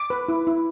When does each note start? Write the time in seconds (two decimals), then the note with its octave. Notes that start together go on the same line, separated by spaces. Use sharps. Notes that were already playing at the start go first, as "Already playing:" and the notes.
Already playing: D6
0.10 B4
0.28 E4
0.47 E4